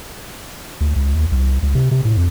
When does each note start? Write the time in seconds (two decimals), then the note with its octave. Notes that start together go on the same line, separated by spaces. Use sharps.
0.81 D2
0.96 C#2
1.15 D#2
1.32 C2
1.63 C#2
1.75 C3
1.91 C3
2.05 A2
2.17 F2